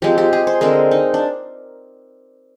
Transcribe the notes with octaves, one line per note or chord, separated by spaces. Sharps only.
F3 G#3 C4 G4
G4
G#4
C5
D3 G#3 C4 A#4
D#4
D4